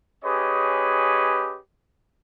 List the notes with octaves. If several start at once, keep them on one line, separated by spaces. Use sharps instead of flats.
C#4 G4 G#4 B4 C#5 D#5